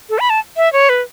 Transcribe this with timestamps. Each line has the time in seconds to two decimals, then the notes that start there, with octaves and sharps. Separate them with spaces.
0.10 A4
0.19 B5
0.30 A5
0.57 E5
0.73 C#5
0.89 B4